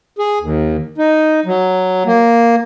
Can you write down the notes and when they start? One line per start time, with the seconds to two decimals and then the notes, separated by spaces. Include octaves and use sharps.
0.19 G#4
0.40 D#2
0.98 D#4
1.46 F#3
2.06 A#3